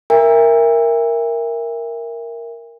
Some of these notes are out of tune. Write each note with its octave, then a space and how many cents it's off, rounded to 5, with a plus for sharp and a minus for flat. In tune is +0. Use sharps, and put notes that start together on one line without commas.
A#4 +0 E5 +10 G5 +45